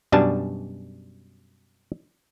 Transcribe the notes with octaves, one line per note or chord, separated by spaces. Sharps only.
F#2 B2 G3 D4 G#5 A5